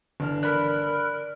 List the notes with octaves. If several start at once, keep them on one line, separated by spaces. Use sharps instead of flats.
G1 D3 E3 D4 F6
A#4 D5 B5 F#6